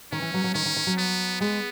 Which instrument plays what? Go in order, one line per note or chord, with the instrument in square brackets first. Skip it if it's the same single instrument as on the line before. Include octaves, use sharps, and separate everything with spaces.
[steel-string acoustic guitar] D#3 [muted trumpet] C#4
[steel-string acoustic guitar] E3
F#3
F#3
[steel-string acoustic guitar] D#3 [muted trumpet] C#4
[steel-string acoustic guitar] D#3
D#3
F#3
[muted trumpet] B3
[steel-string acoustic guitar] G#3 [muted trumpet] B3